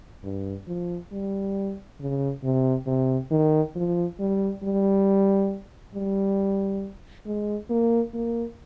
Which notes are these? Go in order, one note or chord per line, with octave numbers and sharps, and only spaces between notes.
G2
F3
G3
C#3
C3
C3
D#3
F3
G3
G3
G3
G#3
A#3
A#3